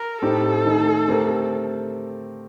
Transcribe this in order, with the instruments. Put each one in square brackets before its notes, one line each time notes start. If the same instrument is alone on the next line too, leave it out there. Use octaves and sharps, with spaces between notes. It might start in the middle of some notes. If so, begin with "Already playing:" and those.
Already playing: [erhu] A#4
[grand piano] A2 A3 C4 D#4 G4 [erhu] A4
[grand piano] D#3 A3 D#4
D3 A3 C4 G4 A#4